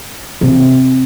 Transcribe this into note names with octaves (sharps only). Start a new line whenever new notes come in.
C3